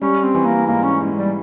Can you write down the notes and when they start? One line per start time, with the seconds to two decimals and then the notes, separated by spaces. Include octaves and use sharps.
0.01 G3 C#4
0.23 C4
0.35 E3
0.45 A#3
0.67 G#2 A#3
0.83 C#4
1.00 G#2
1.16 G3